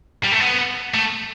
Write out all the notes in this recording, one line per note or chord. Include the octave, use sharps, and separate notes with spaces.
G3
A3
B3
A3